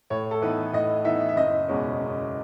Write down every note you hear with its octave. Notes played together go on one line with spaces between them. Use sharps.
A2 C#5
A4
E3 B3 D#4 B4
A2 D#5
E3 B3 D#4 E5
E5
F#1 D#5
E2 B2 G#3 C#4
F#1